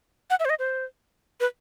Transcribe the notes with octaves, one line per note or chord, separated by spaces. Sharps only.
F#5
E5
C5
D#5
C5
B4